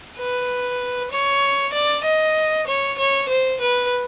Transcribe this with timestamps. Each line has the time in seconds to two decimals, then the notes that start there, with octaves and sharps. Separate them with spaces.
0.18 B4
1.11 C#5
1.74 D5
2.05 D#5
2.67 C#5
2.98 C#5
3.29 C5
3.61 B4